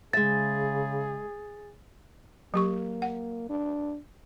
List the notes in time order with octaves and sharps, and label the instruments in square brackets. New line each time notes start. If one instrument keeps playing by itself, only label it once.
[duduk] C#3 [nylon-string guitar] G#3 E5 [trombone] G#4 [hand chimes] A6
[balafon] F#3 G4 C#6 [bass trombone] A#3
[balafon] F#5
[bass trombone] D4